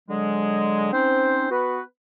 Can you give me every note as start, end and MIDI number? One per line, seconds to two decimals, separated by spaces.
0.09 0.88 50
0.09 0.88 54
0.09 0.88 56
0.93 1.46 60
0.93 1.46 61
0.93 1.46 63
0.93 1.46 72
1.51 1.80 59
1.51 1.80 66
1.51 1.80 71